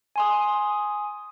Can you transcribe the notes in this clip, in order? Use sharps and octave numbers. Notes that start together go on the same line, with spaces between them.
G#5 C6 D#6